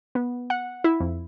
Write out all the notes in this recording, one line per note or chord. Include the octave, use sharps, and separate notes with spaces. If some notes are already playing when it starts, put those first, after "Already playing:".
B3
F#5
E4
F2